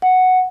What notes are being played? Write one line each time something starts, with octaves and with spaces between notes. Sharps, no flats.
F#5